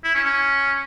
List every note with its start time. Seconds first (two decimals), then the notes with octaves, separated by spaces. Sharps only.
0.04 E4
0.14 C#4
0.24 C#4